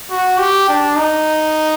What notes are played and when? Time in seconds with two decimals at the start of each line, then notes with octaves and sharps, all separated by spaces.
0.11 F#4
0.39 G4
0.69 D4
0.97 D#4